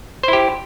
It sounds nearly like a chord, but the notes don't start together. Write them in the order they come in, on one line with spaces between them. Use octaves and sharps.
C5 E4 G4